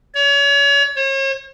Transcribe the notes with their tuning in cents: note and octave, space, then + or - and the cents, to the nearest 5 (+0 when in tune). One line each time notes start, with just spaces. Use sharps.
C#5 +35
C#5 -40